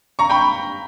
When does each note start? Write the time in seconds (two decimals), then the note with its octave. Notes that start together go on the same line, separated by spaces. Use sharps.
0.19 A#5 C#6
0.30 G5 B5